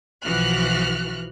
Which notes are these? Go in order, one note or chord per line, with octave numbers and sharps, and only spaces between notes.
B1 E3 F3 F#4 F6 F#6